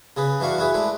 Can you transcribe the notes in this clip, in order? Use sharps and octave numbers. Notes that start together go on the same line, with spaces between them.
C#3 G#4 B4
E3 D4 F#4 F5 C#6
E4 F#4 G#4 B4
G#3 A3 D4 E4